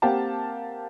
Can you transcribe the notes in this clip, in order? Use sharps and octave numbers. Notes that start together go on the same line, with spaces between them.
A#3 C4 G4 F5 F#5 A5